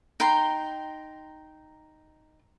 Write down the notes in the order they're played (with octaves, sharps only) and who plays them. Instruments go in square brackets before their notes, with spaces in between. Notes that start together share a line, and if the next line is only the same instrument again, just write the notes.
[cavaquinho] D#4 G5 A#5 C6